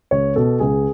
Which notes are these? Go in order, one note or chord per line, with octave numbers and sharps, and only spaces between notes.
C#2 C#5
B2 A4
C#2 G#4